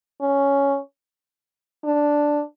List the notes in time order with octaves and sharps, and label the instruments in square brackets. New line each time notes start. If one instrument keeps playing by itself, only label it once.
[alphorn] C#4
D4